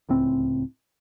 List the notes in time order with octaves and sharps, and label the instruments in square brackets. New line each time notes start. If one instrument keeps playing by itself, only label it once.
[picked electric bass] D1 C#2 A2 C4